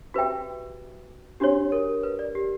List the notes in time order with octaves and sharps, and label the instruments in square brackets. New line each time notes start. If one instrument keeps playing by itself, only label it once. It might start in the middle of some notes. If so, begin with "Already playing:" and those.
[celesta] F#4 [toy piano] G4 B4 E5 G5
[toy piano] D4 F#4 C#5 [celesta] G4
[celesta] A#4
B4
D5
G4